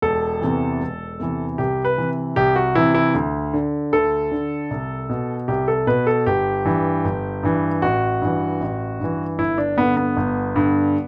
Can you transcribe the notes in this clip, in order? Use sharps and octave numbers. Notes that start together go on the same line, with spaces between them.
E1 A4
E2 C3 E3
E1
E2 C3 E3
C2 G4
B4
C3 E3
C2 G4
F#4
C3 E3 E4
E4
D2
D3
D2 A4
D3
C2
B2
C2 G4
A4
B2 B4
A4
G1 G4
G2 E3
G1
G2 E3
A1 F#4
G2 E3
A1
G2 E3
G1 E4
D4
G2 D3 B3
B3
G1
G2 D3